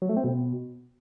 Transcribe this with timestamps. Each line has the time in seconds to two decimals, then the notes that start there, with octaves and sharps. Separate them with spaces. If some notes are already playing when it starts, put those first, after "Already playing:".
0.02 F#3
0.09 A3
0.17 C4
0.24 B2